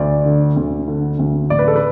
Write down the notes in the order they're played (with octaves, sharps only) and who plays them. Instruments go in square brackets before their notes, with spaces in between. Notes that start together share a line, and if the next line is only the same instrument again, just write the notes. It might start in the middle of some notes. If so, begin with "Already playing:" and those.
Already playing: [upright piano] D2 D5
D3
D2
D3
D2
A1 D5
B4
A4
B4